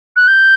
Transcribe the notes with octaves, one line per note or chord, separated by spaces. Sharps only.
F#6
G6